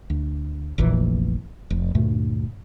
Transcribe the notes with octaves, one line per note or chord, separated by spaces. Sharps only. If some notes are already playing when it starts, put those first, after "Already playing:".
D2
F1 A#1 A#2 E3
F1
D2 G2 A#2 A3